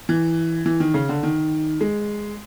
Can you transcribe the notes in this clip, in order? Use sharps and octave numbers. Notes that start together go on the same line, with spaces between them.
E3
E3
D#3
C#3
D3
D#3
G#3